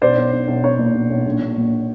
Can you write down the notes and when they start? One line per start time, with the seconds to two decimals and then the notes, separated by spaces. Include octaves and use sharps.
0.01 B1 C5 D5
0.17 B1
0.32 B1
0.48 B1
0.63 B1 C#5
0.79 A#2
0.94 B1
1.10 B1
1.26 A#1
1.41 A#2
1.57 A#1